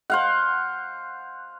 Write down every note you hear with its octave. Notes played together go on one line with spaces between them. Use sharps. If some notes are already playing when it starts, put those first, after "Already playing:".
C5 F5 F#5